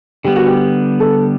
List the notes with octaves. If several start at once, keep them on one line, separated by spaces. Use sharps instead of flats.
D3 G3 B3 G4
F#4
G4
A4